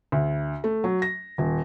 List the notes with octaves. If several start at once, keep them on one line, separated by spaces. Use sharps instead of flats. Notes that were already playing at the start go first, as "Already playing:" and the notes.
D2
A3
F#3
A#6
D#1